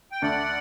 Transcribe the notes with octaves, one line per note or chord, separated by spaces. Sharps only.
G5
D2 D3 A3 D5 F#5